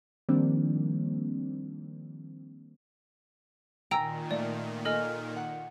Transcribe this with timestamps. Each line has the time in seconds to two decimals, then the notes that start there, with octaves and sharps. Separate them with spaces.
0.29 D#3 F3 G3 A#3 C4 D4
3.91 A#2 D#3 G5 G#5 A#5 E6
4.31 A3 D5
4.85 A4 D#5 G#5 F6 A#6
5.36 F#5